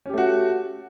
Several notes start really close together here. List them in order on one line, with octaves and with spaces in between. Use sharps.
C#4 G4 A3 F#4